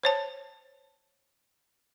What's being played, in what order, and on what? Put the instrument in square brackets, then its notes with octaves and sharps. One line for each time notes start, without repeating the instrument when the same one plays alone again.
[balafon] C5 C#5 A5